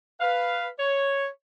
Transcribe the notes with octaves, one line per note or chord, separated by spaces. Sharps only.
B4 F5
C#5